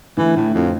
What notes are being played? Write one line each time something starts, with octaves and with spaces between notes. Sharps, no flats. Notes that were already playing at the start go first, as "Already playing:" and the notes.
D3 E3 A3 E4
A2
F2